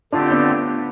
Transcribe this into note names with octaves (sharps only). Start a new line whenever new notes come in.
D3 A3 C4 D4 F4 G4
B3 D4